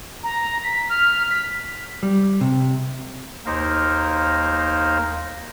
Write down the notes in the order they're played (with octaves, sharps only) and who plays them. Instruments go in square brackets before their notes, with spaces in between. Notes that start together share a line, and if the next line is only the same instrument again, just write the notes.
[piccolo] A#5
B6
F6
B6
[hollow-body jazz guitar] G3
C3
[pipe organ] D#2 A#3 D#4 A#4 C5